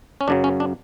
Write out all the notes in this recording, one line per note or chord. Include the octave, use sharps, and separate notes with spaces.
C#4
F#2 C#3 F#3 D4
C#4
D4